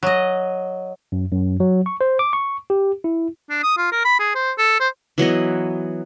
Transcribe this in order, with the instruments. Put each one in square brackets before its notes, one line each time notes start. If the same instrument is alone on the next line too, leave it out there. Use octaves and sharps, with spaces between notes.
[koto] F#3 D#5
[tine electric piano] F#2
F#2
F#3
C#6
C5
D6
C#6
G4
E4
[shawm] D4
D#6
F4
A#4
B5
G#4
C5
A4
C5
[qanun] E3 F#3 B3 D#5